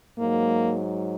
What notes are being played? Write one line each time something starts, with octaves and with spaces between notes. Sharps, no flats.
G#2 F#3 A#3